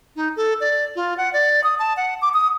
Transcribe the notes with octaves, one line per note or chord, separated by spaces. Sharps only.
D#4
A4
D5
F4
F#5
D5
D#6
A5
F#5
D6
D#6